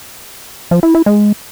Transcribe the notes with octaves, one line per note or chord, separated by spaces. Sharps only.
F3
E4
E4
G#3